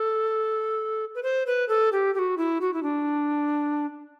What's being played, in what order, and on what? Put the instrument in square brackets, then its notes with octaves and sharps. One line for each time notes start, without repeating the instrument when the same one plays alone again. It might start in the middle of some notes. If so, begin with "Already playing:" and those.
Already playing: [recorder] A4
B4
C5
B4
A4
G4
G4
F#4
E4
F#4
E4
D4